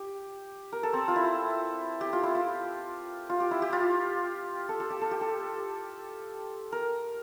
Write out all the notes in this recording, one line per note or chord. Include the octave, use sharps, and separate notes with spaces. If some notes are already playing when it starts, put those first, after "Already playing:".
Already playing: G4
A#4
A4
C4
F4
E4
G4
F4
E4
F4
F4
G4
E4
G4
F4
A4
A4
G4
A4
G4
A4
A#4